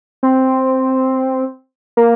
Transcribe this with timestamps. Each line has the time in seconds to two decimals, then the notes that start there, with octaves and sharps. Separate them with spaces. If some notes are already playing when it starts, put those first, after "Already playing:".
0.23 C4
1.97 A#3